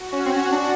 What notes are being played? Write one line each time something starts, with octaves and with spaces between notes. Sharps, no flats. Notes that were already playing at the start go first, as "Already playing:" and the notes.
Already playing: F#4
C#4
C4
C#4
D4